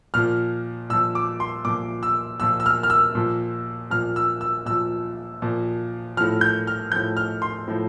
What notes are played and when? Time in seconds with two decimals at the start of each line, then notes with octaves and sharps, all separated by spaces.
0.14 A#2 F3 F6
0.89 A#2 F3 E6
1.15 D6
1.40 C6
1.65 A#2 F3 D6
2.03 E6
2.40 A#2 F3 E6
2.60 E6
2.66 F6
2.83 F6
2.90 E6
3.15 A#2 F3
3.90 A#2 F3 F6
4.16 E6
4.41 E6
4.66 A#2 F3 E6
5.42 A#2 F3
6.17 A2 F3 F6
6.41 G6
6.67 F6
6.92 A2 F3 G6
7.17 F6
7.42 C6
7.68 A2 F3